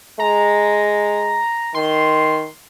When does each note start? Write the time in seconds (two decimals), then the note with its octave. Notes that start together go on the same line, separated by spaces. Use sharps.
0.19 G#3 A#5
1.74 D#3 C6